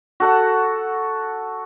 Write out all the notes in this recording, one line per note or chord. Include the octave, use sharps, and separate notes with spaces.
F#4 A4 F#5